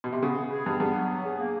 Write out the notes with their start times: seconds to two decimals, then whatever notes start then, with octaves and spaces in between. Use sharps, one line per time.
0.04 B2
0.13 C3
0.22 C#3 B3
0.36 B3
0.51 G#4
0.65 G2 B3
0.80 G2 B3
0.95 F#3
1.09 B3
1.24 G#4
1.38 A#3